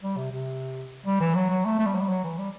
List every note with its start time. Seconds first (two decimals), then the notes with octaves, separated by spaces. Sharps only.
0.02 G3
0.17 C3
0.31 C3
1.06 G3
1.20 E3
1.35 F#3
1.50 F#3
1.65 A3
1.79 A3
1.86 G3
1.94 F#3
2.01 G3
2.09 F#3
2.24 E3
2.38 G3